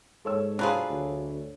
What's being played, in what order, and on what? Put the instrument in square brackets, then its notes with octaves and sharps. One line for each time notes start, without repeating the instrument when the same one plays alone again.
[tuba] G#2 [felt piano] A4 C#5 E6
[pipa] F#3 B4 C5 [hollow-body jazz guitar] D4 F4 G#4
[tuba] D2